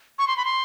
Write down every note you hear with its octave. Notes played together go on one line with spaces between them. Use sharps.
C#6
C6
B5
C6